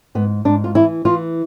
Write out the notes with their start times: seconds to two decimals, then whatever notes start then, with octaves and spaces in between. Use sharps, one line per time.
0.15 G#2 B3
0.45 G#2 D4
0.64 F4
0.75 E3 E4
1.05 E3 F4